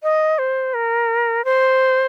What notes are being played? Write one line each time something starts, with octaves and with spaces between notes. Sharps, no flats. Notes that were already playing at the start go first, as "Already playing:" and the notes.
D#5
C5
A#4
C5